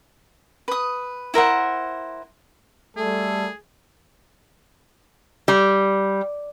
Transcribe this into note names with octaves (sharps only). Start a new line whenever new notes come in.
B4 D#6
E4 A#4 C5 F#5
G3 A3 G#4 A4
G3